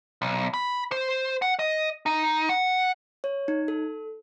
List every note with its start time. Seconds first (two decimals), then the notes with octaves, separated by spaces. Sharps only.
0.22 B1
0.54 B5
0.92 C5
1.42 F#5
1.59 D#5
2.06 D#4
2.49 F#5
3.24 C#5
3.48 D#4
3.68 A4